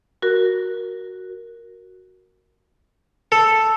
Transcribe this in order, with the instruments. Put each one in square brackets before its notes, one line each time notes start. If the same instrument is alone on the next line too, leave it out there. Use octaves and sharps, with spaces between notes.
[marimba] F#4 A#4
[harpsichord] A4